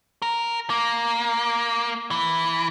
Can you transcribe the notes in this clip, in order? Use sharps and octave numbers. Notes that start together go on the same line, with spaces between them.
A#4
A#3
E3